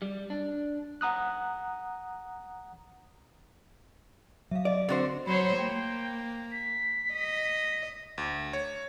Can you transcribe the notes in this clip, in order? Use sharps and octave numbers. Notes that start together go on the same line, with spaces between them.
G3
D4
F#5 A#5 D#6 F#6
F#3 E5 F5
D5 D#5
D3 C4 F#4 C5 A6
F#3 C5 C#5 B5
A#3 G5
B6
D#5
D2
C#5